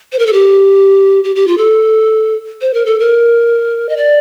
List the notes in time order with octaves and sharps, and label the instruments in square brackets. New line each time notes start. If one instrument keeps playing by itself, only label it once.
[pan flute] C5
A#4
A4
G4
G4
G4
F4
A4
C5
A#4
A4
A#4
D#5
D5